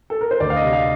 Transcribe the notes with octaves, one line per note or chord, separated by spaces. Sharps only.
A4
A#4
C5
D2 D5
F5
D#5
C3
F5